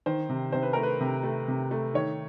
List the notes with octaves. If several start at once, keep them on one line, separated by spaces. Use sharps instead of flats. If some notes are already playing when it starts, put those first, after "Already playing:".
D#3 C5
C3
C3 C5
B4
A3 A#4
B4
C3
A3
C3
A3
D#3 C#5